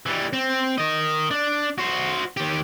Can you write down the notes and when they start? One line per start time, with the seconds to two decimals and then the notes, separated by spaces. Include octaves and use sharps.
0.06 E3 G3
0.33 C4
0.78 A#4 D#5
1.31 D4
1.78 F#4 C5
2.37 D#3 G4